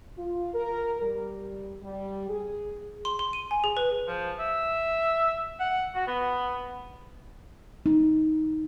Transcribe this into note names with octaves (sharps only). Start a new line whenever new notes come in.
F4
A#4
G3
G3
G#4
C6
C6
D#7
G#5
G#4
B4
F3
E5
F#5
F#4
B3
D#4